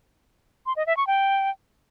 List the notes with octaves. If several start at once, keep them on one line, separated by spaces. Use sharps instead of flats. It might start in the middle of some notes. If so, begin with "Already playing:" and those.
C6
D#5
E5
C#6
G5